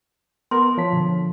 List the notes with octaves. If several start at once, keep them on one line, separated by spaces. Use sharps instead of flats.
B3 A#4 C6
F3 C#5 A5 B6
B2 D3